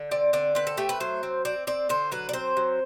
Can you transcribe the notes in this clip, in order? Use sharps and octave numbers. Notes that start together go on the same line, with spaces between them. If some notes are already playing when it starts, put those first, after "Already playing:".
Already playing: D3
C4 D5
D3 D5
C4 B4
A4
A3 G4
B4
F#3 C5
C4
C4 D5
C4 D5
D3 C5
F#3 B4
D5
C4 C5
F#3